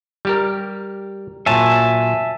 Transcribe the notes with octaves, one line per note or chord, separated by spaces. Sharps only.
G3 G4 A#4
A#2 F#3 C#5 E5 G#5 A5